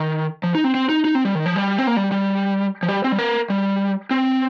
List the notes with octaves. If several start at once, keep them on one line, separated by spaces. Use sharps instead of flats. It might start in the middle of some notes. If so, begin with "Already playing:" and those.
Already playing: D#3
F3
D#4
C4
C4
D#4
D#4
C4
G3
D#3
F3
G3
C4
A#3
G3
G3
F3
G3
C4
G3
A#3
G3
C4